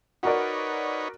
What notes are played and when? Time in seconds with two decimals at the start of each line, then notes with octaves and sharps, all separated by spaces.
0.23 D#4 F#4 A#4 B4 C#5 D5